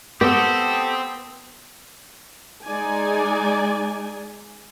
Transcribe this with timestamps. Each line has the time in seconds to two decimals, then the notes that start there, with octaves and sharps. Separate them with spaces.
0.21 B3 C4 G4 A4 D#6
2.65 G#3 D#4 D5 G#5